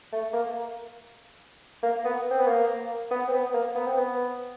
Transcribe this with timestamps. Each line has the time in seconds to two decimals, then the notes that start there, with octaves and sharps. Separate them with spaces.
0.12 A3
0.33 A#3
1.83 A#3
2.04 B3
2.30 C4
2.39 B3
2.47 A#3
3.11 B3
3.27 C4
3.32 B3
3.53 A#3
3.75 B3
3.86 C4
3.97 B3